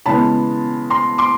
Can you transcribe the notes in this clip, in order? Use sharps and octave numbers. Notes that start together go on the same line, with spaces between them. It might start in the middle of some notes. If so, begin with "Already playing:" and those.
C#3 E3 G#3 B3 A5 B5
A#5 C6
C6 D6